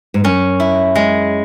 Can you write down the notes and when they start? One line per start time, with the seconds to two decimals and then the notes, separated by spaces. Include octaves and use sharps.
0.14 G#2
0.24 F#2 C#4
0.60 E4
0.95 G#3